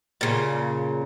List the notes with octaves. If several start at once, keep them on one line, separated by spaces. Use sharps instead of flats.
A#2 C#3